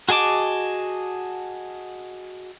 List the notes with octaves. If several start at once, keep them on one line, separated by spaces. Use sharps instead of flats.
F#4 G#4 D#5 A5 D6